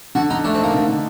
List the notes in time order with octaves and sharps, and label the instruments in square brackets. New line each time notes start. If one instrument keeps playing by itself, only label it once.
[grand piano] D3 [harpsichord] F#4
[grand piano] D3 [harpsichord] D#4
[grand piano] A3 [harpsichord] D4
[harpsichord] C4
[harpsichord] A#3 [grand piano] D#4
[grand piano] D3
D3